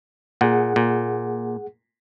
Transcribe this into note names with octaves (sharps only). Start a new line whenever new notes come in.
A#2 G#4 F#5
A#2